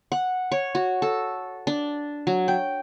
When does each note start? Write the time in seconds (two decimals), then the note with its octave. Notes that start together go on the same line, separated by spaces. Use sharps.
0.12 F#5
0.52 C#5
0.75 F#4
1.02 A4
1.67 D4
2.27 F#3
2.48 G5